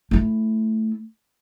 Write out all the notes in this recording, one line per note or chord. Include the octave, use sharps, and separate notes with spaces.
A3 E4